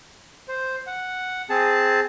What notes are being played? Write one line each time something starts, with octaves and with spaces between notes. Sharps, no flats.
C5
F#5
C4 G#4 A5